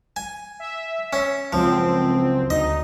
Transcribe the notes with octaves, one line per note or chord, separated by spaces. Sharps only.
G#5
E5
C#4
C#2 F#2 F3 C4
D2 D#4 D#5